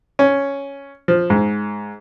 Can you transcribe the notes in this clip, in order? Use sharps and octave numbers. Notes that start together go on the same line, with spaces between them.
C#4
F3
G#2